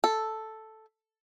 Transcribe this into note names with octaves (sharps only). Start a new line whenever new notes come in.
A4